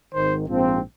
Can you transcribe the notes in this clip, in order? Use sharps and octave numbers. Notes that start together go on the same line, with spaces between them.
G#1 G#2 D#3 C5
A#1 G#2 F3 C4